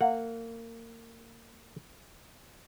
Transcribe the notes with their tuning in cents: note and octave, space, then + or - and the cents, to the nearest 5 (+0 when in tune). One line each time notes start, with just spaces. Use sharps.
A#3 -30 F#5 -15